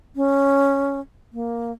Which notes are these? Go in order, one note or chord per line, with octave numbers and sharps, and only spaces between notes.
C#4
A#3